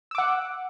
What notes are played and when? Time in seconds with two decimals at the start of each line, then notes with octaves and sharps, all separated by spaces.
0.11 E6
0.15 D6
0.18 F#5